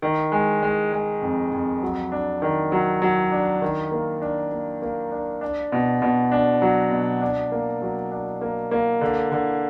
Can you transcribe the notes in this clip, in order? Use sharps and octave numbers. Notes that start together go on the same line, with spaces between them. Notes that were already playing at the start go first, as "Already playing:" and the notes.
D#3
G#3
G#3
G#3
F2
F2
F#3
D4
D#3
F#3
F#3
D4
D#3
A#3
D4
A#3
A#3
D4
D4
B2
B2
D4
F#3
B2
D4
A#3
F#3
D4
A#3
A#3
D3
D3